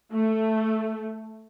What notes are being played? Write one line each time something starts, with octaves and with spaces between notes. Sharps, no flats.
A3